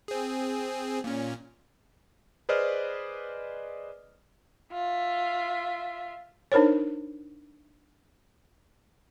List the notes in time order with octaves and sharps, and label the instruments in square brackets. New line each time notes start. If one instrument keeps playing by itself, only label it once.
[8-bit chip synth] C4 G#4
A#2 C#4
[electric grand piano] G#4 B4 C5 D5 D#5 F6
[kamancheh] F4 E5
[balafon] D4 D#4 A#4 C5 C#5